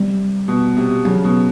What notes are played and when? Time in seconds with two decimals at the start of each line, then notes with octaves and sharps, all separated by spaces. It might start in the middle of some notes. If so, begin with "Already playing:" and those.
Already playing: C3 G3
0.48 B2
0.77 C3
1.05 C#3 F#3
1.24 B2